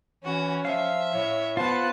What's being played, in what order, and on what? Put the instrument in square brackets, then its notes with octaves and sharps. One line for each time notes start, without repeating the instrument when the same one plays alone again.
[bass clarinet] E3 [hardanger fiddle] C#4 [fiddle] F#4
[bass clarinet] F3 [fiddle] E5 [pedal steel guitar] F5
[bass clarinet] A2 [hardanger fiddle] C#5
[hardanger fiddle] B3 [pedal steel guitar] F4 F#5 [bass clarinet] C5 [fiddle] A5